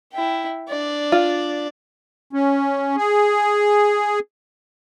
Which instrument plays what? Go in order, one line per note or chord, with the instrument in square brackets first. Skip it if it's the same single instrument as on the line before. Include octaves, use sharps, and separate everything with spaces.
[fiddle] E4 G5
D4 D5
[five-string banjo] F4
[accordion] C#4
G#4